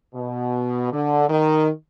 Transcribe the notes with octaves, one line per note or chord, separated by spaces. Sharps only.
B2
D3
D#3